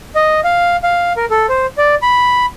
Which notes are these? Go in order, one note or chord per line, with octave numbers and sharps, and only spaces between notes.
D#5
F5
F5
A#4
A4
C5
D5
B5